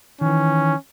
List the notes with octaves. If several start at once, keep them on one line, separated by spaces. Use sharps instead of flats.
D#3 E3 C#4